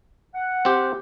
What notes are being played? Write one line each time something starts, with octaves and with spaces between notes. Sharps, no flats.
F#5
C4 G4